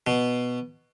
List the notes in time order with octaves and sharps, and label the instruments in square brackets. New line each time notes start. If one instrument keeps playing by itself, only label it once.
[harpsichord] B2